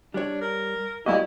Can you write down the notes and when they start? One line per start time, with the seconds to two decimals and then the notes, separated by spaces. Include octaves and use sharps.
0.14 G3 D4 C#5
0.41 A#4
1.06 G3 A#3 E4 F#4 G4 C#5 D#5